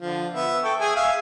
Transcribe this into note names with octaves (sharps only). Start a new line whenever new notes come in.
D3 F3
B3 E5
A4 G5 C#6
G#4 E5 G#5
E5 F5 G#5